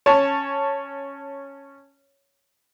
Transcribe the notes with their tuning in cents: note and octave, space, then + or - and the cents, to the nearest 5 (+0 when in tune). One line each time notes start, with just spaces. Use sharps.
C#4 -5 C#5 +0 A5 +0